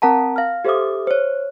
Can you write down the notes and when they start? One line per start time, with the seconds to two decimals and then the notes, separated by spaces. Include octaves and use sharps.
0.02 C4 A#4 F#5 A5 A#5
0.36 F5 F6
0.65 G4 A4 C5 E5 D6 D#6
1.07 C5 C#5